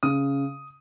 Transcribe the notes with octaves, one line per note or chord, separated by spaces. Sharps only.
C#3 D#6